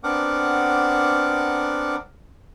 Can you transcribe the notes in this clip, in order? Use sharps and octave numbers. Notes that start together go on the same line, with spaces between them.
B3 C4 D4 A#4 F#5 D6